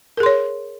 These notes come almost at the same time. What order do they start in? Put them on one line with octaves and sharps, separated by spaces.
A#4 G#4 C6 C#5